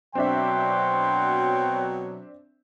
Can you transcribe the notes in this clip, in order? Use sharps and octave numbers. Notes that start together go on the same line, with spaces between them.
B2 F#3 C4 D4 E5 G5 C6